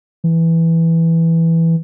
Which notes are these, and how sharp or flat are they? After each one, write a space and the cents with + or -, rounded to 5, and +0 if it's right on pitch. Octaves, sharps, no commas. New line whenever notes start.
E3 +0